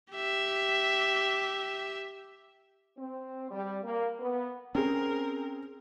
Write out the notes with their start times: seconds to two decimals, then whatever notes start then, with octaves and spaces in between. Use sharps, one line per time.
0.12 G4 E5
2.96 C4
3.51 G3
3.83 A#3
4.20 B3
4.75 C4 C#4 G#4 A#4